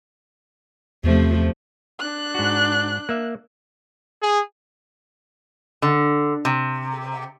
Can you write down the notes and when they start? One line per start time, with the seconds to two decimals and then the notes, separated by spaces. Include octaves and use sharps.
1.04 E2 C3 F3 A3
1.99 D4 F#6
2.35 G#2 F#4
3.09 A#3 E5
4.22 G#4
5.82 D3
6.45 C3